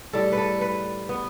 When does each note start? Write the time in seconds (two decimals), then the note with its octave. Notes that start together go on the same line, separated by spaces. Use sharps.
0.13 A2 G3 A4
0.32 B4
0.37 A4
0.61 B4
1.09 B3